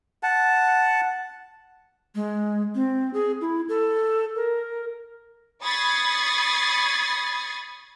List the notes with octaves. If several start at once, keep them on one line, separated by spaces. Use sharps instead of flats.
F#5 A5
G#3
C4
G#4
E4
A4
A#4
B5 C#6 D#6 G#6 A6 C7